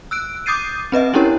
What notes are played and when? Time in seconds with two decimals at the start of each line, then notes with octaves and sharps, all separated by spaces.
0.11 E6 F#6 D7
0.46 D6 D#6 G6 A6 C7 D#7
0.92 C4 B4 D#5 E5
1.14 C#4 D4 E4 G4 A#4 C#5